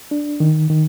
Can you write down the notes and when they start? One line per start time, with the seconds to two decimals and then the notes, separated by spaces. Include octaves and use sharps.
0.11 D4
0.40 D#3
0.70 D#3